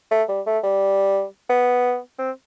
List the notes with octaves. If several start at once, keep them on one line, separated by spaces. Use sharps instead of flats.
A3
G3
A3
G3
B3
C4